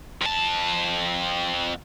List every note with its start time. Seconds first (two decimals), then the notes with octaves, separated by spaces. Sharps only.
0.22 F2 A5